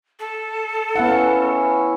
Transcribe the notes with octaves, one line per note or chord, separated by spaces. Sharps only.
A4
B3 C#4 E4 F5 F#5